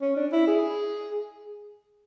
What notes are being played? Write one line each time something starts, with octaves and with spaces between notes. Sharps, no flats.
C#4
D4
E4
G#4